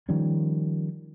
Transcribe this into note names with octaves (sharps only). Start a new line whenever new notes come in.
D#3 F3 G3 C#4